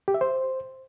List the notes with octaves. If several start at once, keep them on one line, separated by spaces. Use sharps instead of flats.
G4
E5
C5